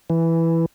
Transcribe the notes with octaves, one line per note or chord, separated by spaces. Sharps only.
E3